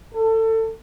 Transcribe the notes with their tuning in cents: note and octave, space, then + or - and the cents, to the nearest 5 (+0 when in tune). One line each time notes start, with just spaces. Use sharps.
A4 +25